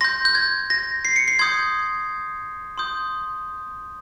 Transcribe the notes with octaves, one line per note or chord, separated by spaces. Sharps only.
C6 G6 A#6
G6
G#6
A#6
C7
C#7
C7
C6 D#6 G6 G#6
C6 D#6 G6